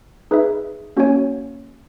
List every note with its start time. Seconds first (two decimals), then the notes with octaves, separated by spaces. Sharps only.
0.31 D#4 G#4 B4 E5
0.97 A#3 C#4 F#4 C#5 G#5